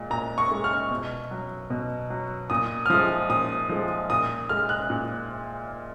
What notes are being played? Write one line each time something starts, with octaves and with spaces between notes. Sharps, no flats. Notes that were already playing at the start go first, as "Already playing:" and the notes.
Already playing: A#2 G#3
A#2 A#5
C#6
G#3
F6
B2
F#3
B2
F#3
A#2 D#6
F6
F3 G#3 D#6
A#2 D#6
F3 G#3
A#2 D#6
G#3 F6
F#6
A#2